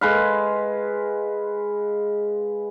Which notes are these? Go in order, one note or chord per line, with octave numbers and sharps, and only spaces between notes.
G#3 B4 F5